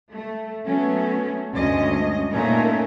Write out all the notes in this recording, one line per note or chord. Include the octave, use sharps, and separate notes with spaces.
A3
F#3 A3 B3 C#4
D2 G2 G#3 C#4 D#5
A#2 A3 C#4 D#4 A#4